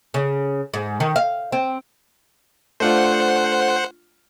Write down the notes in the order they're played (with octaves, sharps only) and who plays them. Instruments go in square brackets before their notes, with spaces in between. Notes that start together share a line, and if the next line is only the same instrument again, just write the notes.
[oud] C#3
G#2
D#3
F5
C4
[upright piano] A3 D4 F4 [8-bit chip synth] C5 F#5